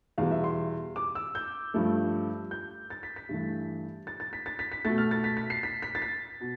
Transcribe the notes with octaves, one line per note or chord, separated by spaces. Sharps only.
E2 B2 G3 F5
E5
C6
D6
E6
G6
G2 F3 A3
G6
A6
B6
B6
G2 E3 A3
A6
A6
B6
A6
B6
B6
B2 A3 A6
F6
A6
B6
B6
C7
B6
B6
A6
B6
B2